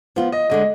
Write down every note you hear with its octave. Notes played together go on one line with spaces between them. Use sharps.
F3 B3 F4
D#5
D2 D3 G#3 D#5